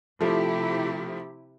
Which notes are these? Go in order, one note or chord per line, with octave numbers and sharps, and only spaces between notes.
C3 F3 A3 E4 G4